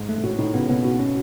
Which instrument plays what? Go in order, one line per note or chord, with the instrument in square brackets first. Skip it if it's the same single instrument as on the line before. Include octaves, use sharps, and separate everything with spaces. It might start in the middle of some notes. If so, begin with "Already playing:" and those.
Already playing: [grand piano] G#2
[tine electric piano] A3
[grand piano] G#2
[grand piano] A2 [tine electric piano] F#4
[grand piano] A2 [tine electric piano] D#4
[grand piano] C#3 [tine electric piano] B3
[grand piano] B2 [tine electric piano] B3
[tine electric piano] F#4
C#4